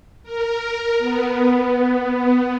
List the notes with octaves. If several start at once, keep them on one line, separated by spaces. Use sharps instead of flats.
A#4
B3